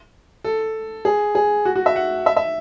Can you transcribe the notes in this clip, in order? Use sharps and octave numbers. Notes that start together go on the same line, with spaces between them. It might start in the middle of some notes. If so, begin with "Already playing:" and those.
A4
G#4
G#4
F#4
F#4
E5
F#5
E5
E5